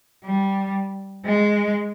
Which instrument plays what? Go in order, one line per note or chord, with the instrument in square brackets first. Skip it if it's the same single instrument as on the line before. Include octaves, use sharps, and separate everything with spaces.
[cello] G3
G#3